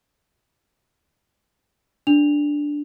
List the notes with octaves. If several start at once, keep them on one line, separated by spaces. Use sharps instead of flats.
D4 F7